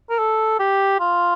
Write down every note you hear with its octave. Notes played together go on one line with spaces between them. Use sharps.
A#4
A4
G4
F4